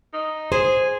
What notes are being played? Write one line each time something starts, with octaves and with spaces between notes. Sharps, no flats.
D#4
G#4 C5